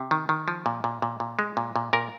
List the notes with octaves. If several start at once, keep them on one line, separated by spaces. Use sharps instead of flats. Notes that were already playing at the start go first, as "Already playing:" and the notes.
Already playing: C3
D#3
D#3
F3
A#2
A#2
A#2
A#2
G#3
A#2
A#2
A#2 A#4